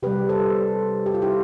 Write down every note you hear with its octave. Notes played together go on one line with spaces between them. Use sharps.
C3 G3 G4 B4
A4 C5
G4
F4
E4 G4